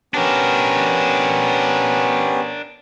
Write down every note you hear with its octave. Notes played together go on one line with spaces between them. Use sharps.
B3 C#4 D4 G4 A#4